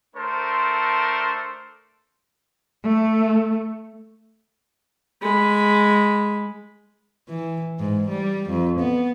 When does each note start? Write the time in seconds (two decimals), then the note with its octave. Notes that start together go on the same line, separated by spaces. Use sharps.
0.15 A3 D4 A4 A#4 C5
2.84 A3
5.21 G#3 B5
7.29 E3
7.79 G#2
8.09 G3
8.49 F2
8.79 B3